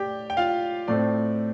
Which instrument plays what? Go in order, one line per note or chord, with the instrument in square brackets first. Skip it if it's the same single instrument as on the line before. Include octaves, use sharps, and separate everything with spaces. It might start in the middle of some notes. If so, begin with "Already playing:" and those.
Already playing: [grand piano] A2 G4 D5 G5
G5
F4 F5
A2 A3 C4 D5